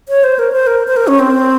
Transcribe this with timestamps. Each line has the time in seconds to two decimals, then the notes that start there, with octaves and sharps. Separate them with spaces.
0.09 C#5
0.24 C5
0.39 A#4
0.52 C5
0.67 A#4
0.88 C5
0.97 A#4
1.08 C#4
1.19 C4